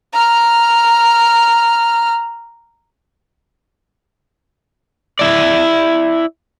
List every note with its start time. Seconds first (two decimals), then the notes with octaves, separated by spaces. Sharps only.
0.13 A#5 F6
5.19 E4 D5